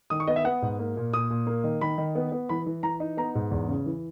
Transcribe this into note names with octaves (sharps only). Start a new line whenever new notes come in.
D#3 D#6
C#6
B3 D#5
E5
B3 F#5
G#2
A#3
A#2
A#2 D#6
A#2
A#3
D#3
D#3 B5
D#3
B3
B3
E3 B5
E3
E3 A#5
D#4
B3 A#5
G#2
E2
C#3
E3